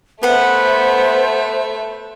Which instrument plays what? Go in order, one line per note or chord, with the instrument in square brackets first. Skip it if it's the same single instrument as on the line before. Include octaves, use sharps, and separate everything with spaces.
[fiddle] A3 E5 [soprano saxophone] B3 [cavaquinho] B4 F#5 [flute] C5